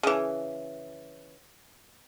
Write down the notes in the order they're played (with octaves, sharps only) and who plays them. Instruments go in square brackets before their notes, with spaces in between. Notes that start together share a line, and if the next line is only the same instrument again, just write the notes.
[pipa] C#3 E3